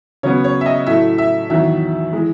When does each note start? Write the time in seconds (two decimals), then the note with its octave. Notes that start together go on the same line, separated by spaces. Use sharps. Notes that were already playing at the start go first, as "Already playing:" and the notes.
0.23 C#3 F#3 B3 C#5
0.44 C#5
0.61 E5
0.66 D#5
0.86 A2 F#3 A3 E5
1.18 E5
1.50 E2 D#3 F#3 E5
2.13 E3 G#3